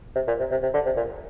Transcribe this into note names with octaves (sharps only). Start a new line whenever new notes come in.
C3
A#2
C3
C3
C3
D3
C3
A#2